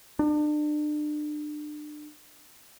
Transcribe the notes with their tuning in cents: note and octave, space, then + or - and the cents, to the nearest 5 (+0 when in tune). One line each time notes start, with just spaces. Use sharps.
D4 +35